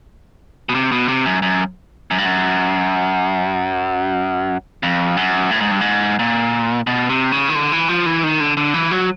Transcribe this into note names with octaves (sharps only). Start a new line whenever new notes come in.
B2
C3
B2
C3
F#2
F#2
F#2
G2
F#2
F2
F#2
A2
G#2
G2
G#2
A#2
B2
C3
C#3
D#3
D3
E3
F3
E3
D#3
D3
D3
E3
F#3